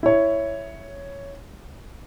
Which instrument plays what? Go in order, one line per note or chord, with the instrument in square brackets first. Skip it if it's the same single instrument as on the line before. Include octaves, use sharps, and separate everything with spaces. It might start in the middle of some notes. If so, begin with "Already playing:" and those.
[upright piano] E4 C#5